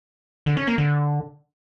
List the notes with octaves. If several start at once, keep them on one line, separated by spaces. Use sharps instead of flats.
D3
C#4
A#3
D3